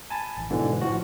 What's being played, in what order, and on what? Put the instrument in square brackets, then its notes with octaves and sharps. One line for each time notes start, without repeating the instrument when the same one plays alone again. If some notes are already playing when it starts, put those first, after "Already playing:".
[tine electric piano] G#5 A5 B5 A6
A1
G#2 B2 D3 E3
A2 F3 F#4